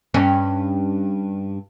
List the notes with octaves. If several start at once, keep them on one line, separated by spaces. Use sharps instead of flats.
G2 C#4